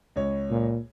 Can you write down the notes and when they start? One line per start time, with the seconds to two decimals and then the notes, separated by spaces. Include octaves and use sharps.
0.16 C#2 C#5
0.50 A#2